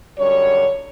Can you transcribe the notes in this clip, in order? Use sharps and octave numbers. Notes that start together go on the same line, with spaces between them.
F#2 D3 G3 C#5